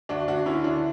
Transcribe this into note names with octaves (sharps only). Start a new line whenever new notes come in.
D2 D4 F#4
D2 D4 F#4
D3 C#4 E4
D3 D4